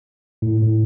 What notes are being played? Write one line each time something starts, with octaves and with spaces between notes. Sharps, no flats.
A2
A2